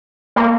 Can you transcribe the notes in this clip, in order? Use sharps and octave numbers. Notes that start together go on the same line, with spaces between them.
A#3